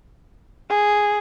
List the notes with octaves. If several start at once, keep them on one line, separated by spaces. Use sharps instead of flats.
G#4